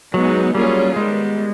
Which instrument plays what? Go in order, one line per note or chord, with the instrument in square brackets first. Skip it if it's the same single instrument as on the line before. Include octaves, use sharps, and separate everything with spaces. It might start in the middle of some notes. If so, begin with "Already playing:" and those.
[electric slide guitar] F#3 [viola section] G#3 B3 D#4
[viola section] F#3 A#3 C#4 F4 G#4 [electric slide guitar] G3
[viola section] D#3 G3 B3 [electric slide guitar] G#3